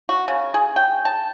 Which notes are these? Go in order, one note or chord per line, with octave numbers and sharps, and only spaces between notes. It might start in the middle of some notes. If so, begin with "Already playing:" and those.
F#4
C#3
G#4
G5
A5